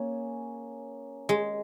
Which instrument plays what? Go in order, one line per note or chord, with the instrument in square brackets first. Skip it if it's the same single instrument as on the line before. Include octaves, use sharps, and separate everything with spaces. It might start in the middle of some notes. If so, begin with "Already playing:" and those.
Already playing: [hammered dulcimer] A#3 C#4 G#4
[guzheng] G#3